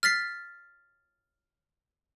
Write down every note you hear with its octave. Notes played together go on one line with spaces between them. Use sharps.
F6 A6 B6 C7